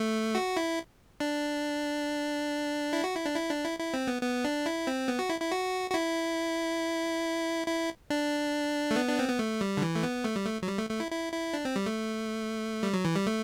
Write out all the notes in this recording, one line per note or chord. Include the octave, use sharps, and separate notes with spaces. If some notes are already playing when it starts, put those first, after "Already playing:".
Already playing: A3
F#4
E4
D4
E4
F#4
E4
D4
E4
D4
E4
E4
C4
B3
B3
D4
E4
C4
B3
F#4
E4
E4
F#4
F#4
E4
E4
D4
A3
B3
D4
C4
B3
A3
G3
D3
E3
A3
B3
A3
G3
A3
F#3
G3
A3
A3
E4
E4
E4
D4
C4
G3
A3
G3
F#3
E3
G3
A3